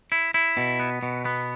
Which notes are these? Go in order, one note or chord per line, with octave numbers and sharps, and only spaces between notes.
E4
E4
B2
B3
B2
B3